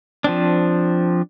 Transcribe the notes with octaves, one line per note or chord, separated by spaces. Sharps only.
F3 C4 D4